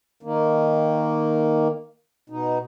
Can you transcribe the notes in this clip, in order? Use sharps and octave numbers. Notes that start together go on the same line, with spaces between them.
D#3 A#3
B2 D#4